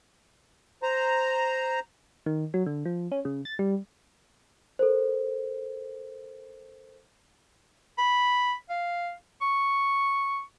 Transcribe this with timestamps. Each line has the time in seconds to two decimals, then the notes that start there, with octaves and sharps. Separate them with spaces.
0.83 C5 A#5
2.26 D#3
2.54 F#3
2.66 D3
2.86 F3
3.12 C#4
3.25 C#3
3.45 A6
3.59 G3
4.79 A4 A#4 C5
7.98 B5
8.70 F5
9.41 C#6